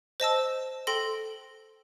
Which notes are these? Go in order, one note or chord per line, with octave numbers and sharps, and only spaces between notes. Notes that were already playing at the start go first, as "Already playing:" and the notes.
C5 D#5 A5 E6
A4 G5 C6 A#6